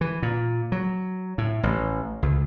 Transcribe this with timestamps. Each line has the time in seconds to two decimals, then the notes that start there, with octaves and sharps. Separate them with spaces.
0.01 E3
0.22 A#2
0.72 F#3
1.38 A2
1.63 A1
2.22 C#2